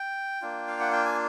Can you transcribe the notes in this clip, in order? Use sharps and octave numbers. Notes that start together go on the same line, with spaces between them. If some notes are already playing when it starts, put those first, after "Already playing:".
Already playing: G5
A#3 D4 F4
F5
F#5
G5
G#5